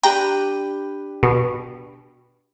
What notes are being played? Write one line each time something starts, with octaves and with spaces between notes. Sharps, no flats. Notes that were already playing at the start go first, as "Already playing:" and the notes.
D4 G4 B4 G5 A#5
B2